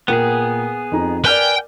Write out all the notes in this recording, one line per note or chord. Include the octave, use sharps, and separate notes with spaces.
A#2 B3 G#4 A#4 G5
F2 D#4 A#5
A#4 B4 D5 G5 G#5 F6